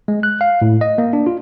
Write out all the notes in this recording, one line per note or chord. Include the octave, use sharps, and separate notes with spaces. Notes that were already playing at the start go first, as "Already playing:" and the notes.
G#3
F#6
F5
A2
D#5
A#3
D4
F4